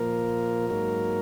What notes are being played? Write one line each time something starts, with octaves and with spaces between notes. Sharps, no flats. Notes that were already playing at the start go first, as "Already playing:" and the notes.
Already playing: A#2 F3 A#3 A#4
G#2 F#3 A#3